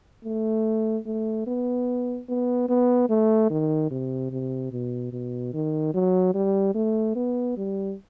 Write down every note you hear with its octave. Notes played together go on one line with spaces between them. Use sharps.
A3
A3
B3
B3
B3
A3
D#3
C3
C3
B2
B2
D#3
F#3
G3
A3
B3
G3